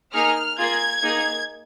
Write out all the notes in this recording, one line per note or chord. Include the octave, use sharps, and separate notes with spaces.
A#3 D#4 G#4 F6
A#3 F4 G#4 G#6
A#3 D#4 G#4